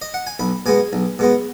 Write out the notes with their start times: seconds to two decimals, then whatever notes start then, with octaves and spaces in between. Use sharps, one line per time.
0.02 D#5
0.14 F#5
0.27 G#5
0.40 B1 B5
0.66 B2 G#3 B3 G#5
0.93 B1
1.19 B2 G#3 B3